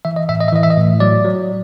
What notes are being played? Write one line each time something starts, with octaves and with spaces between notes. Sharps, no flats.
E3 E5
D#5
A2 E5
D#5
E5
E3 D#5
E5
D#5
A2
F#3 D5
F#3